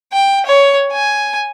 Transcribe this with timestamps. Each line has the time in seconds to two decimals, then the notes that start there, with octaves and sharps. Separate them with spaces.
0.13 G5
0.46 C#5
0.92 G#5